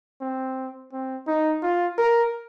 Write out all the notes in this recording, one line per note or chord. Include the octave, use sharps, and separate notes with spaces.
C4
C4
D#4
F4
A#4